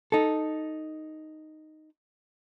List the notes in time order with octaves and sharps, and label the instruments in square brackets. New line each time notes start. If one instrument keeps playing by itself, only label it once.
[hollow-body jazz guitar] D#4 A4